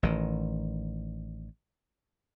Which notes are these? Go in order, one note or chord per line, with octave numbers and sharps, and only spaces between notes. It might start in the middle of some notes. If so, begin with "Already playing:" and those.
A1 D#3